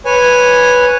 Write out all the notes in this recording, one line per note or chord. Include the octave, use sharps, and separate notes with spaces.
B4 C#5 G#5